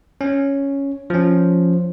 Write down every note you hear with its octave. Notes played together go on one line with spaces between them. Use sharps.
C#4
F3 C#4